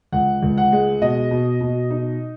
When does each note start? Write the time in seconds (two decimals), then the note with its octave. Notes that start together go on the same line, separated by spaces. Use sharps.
0.12 C#2 F#5
0.42 C#2
0.58 F#5
0.72 G#3
1.02 B2 D#5
1.31 B2
1.61 B2
1.90 D#4